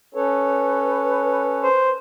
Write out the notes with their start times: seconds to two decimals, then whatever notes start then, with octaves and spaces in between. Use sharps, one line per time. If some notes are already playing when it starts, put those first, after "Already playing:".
0.14 C#4 A4 B4 C#5
1.63 C5